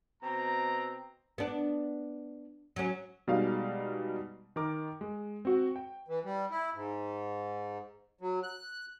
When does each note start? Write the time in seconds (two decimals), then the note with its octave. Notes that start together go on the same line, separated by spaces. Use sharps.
0.23 B2 C4 A#5
1.38 B3 D4
2.76 F#3 C#4
3.28 B2 G3 G#3 D#4 F5
4.56 D#3 A#4 D6
5.01 G#3
5.45 C4 F#4
5.76 G5
6.08 E3
6.24 G3
6.51 E4
6.74 G#2
8.21 F#3
8.43 F#6